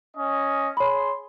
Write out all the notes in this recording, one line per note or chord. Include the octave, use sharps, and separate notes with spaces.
C#4 D#5
G#4 C#5 B5 C6